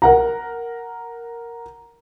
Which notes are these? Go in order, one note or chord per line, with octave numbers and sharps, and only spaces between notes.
A#4 F#5 A#5